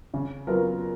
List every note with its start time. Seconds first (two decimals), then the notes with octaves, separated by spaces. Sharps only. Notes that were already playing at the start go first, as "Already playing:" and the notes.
0.14 C#3
0.47 F#3 B3 F4 A#4